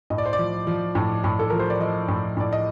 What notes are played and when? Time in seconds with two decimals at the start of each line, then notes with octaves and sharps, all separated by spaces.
0.10 A2 D#5
0.18 D5
0.25 C5
0.33 D5
0.39 F3
0.67 F3
0.95 A2
1.24 A2
1.39 A4
1.50 F3 A#4
1.60 C5
1.70 D5
1.80 F3 D#5
2.08 A2
2.37 A2 D5
2.53 D#5